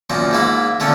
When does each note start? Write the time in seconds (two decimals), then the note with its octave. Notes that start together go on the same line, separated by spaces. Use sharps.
0.10 F#2 A#2 F3
0.31 G#2 A#3 E4
0.80 A#2 D3 A3 C#4